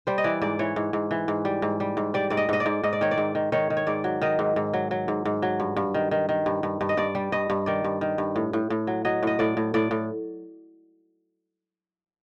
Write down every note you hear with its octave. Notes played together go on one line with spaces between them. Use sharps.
G3 C5
D#5
E3 D5
G#2 D5
E3 C#5
G#2
G#2
E3
G#2
G3
G#2
G3
G#2
G3 D5
G#2 D5
D#5
G#2 D#5
D5
G#2
G#2 D#5
D5
D#3 C#5
D5
G#2
D#3
D#3 C#5
D#3
C#5
G#2 D5
F#3
D#3 D#5
G#2
G#2
F#3
F#3
G#2
G#2
F#3
G2
G2
D#3
D#3
D#3
G2
G2
G2
D#5
G2 D5
G3
G2 D#5
G2
D#3 D5
G2
D#3
G2
A2
A2
A2
F#3
F#3 D#5
A2 D#5
A2 D5
A2
A2 D5
A2